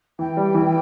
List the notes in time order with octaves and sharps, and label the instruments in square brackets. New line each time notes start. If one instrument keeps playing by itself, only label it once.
[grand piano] E3 [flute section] G5
[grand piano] G3
E3